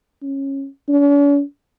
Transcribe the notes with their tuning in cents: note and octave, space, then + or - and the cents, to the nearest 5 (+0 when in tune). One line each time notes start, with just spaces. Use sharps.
C#4 -20
C#4 +45